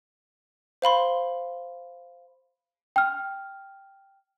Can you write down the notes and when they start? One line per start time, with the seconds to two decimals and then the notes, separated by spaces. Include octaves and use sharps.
0.82 C5 F5 B5 C6
2.96 G5 F6